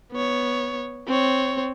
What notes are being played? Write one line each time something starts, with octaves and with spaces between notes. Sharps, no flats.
B3 C#5
C4 C#5